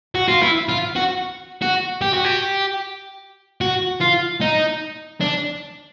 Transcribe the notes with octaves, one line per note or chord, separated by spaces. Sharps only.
F#4
F4
E4
F4
F#4
F#4
G4
F#4
G4
F#4
F4
D#4
D4